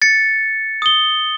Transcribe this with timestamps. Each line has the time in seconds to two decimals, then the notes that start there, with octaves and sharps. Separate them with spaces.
0.02 A6 C#7
0.82 D#6 G7